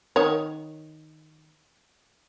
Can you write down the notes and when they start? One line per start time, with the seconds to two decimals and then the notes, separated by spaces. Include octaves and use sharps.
0.16 D#3 C#5